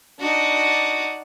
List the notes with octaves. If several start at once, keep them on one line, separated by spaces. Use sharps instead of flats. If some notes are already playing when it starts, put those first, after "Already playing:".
D4 D#4 F#4